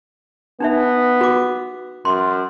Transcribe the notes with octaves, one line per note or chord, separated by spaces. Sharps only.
B3 D4 D#4 E5
F#4 D6
F#2 C6